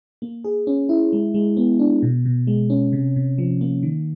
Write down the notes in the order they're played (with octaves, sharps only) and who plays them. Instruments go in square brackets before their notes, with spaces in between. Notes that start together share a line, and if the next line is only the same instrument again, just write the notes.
[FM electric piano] A#3
G#4
C#4
E4
G#3
G#3
B3
D4
B2
B2
G#3
C#4
C3
C3
F3
A#3
D#3